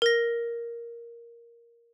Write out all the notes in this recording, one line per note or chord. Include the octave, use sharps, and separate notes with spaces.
A#4 A#6